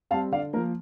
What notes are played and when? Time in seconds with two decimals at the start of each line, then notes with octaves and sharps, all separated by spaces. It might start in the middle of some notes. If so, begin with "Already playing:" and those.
0.11 G3 C4 F5 A5
0.32 D3 D5 F5
0.53 F3 A#3 A#4